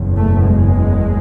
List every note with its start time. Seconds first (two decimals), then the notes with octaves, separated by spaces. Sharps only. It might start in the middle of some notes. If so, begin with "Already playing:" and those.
Already playing: F#1 E2 B2
0.16 A3
0.45 G#3